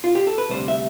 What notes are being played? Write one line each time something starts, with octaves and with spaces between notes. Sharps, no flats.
F4
G4
A4
B4
D2 C3 G3 D4 C5
E5